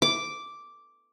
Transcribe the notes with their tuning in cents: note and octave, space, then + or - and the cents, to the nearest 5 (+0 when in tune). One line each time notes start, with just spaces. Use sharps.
D6 -5